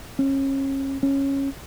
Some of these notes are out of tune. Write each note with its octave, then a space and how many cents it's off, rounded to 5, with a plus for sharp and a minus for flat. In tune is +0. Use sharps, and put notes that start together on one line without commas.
C#4 -30
C#4 -10